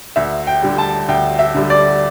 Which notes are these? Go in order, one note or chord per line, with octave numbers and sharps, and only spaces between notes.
D2 E5
G5
D3 G3
A5
D2 G5
E5
D3 G3
D5